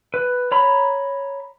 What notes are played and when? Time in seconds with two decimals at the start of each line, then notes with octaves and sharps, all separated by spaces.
0.14 B4
0.52 C#5 A#5 B5